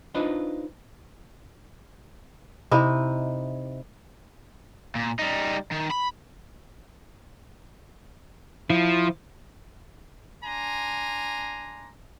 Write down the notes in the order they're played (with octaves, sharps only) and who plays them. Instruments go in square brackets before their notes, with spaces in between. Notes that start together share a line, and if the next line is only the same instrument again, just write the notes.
[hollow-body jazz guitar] D4 D#4 F4 B4 C5 D#5
[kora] C3 D#4 E4
[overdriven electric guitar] A#2
G3 D#4
D#3
B5
[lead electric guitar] F3 [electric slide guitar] E4
[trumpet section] D4 G#5 A#5 C6